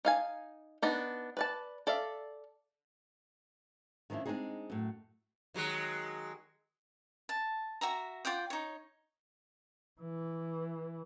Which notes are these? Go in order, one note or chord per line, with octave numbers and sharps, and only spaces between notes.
D#4 F5 G#5
B3 D4 D#4
B4 D5 A5
A4 D5 E5 F5
D#3 F3 C#4 D4 E4
G#3 A3 C4 D4 D#4 G#4
F#2 A2
D#3 F#3 G#3
A5
F#4 E5 A#5
F4 D5 F#5 G5
D#4 C#5
E3